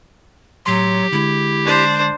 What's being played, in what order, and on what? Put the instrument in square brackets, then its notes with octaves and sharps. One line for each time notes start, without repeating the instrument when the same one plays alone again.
[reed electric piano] A2 C6 [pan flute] F#3 [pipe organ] G4
[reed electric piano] D3 G#3 [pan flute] E4
[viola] D4 C5